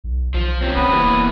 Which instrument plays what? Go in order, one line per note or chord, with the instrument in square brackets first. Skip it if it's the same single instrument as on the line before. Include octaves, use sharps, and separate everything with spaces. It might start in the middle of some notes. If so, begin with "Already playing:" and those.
[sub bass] B1
[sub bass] B1 [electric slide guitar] F3
[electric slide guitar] C4 C#4 G4
[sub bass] D#1 [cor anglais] B3
[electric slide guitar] E3 A#3 E4